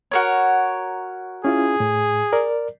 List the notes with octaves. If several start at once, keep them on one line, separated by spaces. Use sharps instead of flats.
F#4 A#4 C#5
C#4 E4 F4 G#4
A2
A#4 D5